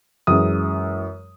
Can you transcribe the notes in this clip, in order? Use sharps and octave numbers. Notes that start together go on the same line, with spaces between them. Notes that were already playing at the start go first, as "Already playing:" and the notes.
F#2 E3 G#3 D#6